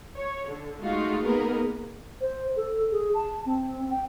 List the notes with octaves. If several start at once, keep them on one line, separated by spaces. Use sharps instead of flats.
C#5
D3
G#3 A3 D#4 F4 F#4
A#3 B3 D#4 G#4 A#4 B4
C5
A4
G#4
A5
C4
G5